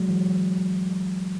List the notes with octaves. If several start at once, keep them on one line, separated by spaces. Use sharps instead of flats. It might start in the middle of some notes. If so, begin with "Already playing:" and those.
Already playing: F#3 G#3
E3